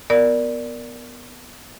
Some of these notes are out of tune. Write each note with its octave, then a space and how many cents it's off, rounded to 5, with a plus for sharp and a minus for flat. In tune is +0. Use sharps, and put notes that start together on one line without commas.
B3 +0 A#4 +0 D5 +0